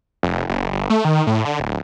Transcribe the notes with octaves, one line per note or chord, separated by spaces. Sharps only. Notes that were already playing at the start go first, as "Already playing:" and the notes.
F1
F#1
G1
A3
D#3
A2
D3
D1